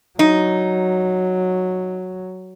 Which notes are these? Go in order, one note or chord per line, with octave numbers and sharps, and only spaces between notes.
F#3 D#4